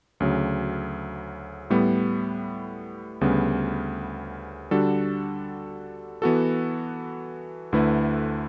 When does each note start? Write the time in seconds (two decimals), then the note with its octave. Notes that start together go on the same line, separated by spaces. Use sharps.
0.20 D2 C#3 F#3
1.70 A2 G3 B3
3.21 D2 C#3 G3 B3
4.71 D3 G3 D4 F#4 A4
6.22 E3 B3 F#4 A4
7.72 D2 D3 A3 E4 B4